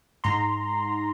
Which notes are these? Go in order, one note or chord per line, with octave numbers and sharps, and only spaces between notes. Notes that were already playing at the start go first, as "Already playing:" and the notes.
G#2 A#5 C6